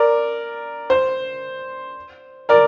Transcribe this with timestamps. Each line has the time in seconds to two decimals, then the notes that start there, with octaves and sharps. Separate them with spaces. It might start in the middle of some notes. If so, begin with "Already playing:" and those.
Already playing: A#4 D5
0.90 C5
2.49 A#4 D5